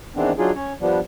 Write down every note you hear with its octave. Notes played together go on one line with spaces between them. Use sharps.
D#3 E3 G#3 B3 C4 D4
F#3 D4 D#4 F4 G#4
C#4 C#5
F3 G3 B3 D4